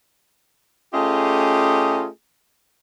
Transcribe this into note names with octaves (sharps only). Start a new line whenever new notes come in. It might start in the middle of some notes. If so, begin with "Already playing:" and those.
A3 C#4 F4 G4 G#4 D#5